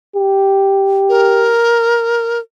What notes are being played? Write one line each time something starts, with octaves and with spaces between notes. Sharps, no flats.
G4
A#4